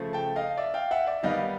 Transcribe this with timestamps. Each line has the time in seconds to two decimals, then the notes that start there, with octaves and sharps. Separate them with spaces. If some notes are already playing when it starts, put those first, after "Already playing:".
Already playing: C#3 F3 A3
0.13 G5 A5
0.36 D#5 F5
0.57 D5 E5
0.74 F5 G5
0.91 E5 F#5
1.07 D5 E5
1.23 D#3 G3 B3 D#5 F5